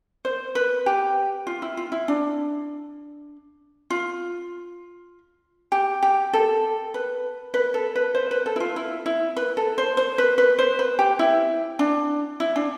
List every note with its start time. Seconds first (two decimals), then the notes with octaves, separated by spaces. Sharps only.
0.25 C5
0.55 B4
0.86 G4
1.47 F4
1.62 E4
1.77 F4
1.92 E4
2.08 D4
3.90 F4
5.72 G4
6.03 G4
6.33 A4
6.94 B4
7.54 B4
7.74 A4
7.96 B4
8.15 C5
8.31 B4
8.46 A4
8.56 E4
8.60 F4
8.76 E4
9.06 E4
9.36 B4
9.57 A4
9.78 C5
9.97 C5
10.18 B4
10.38 B4
10.59 C5
10.79 B4
10.99 G4
11.19 E4
11.79 D4
12.40 E4
12.56 D4